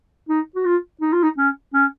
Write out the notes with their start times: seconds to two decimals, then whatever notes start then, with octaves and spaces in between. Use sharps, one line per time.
0.29 D#4
0.55 F#4
0.65 F4
1.01 D#4
1.13 F4
1.23 D#4
1.38 C#4
1.74 C#4